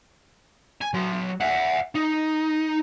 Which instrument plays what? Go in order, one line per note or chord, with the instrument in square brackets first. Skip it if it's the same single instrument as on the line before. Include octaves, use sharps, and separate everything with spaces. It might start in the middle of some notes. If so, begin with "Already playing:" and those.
[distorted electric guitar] G#5
F#3 C6
E5 F#5
D#4